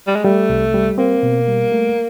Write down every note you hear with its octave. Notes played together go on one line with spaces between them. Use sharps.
G3
G#3
G3 A3
C2
G3
A#3 C4
B2
G3
A3